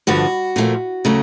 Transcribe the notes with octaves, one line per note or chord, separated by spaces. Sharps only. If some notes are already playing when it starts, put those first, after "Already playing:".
G2 D3 F3 F#4
A#2 F3 A3
C#3 F#3 A3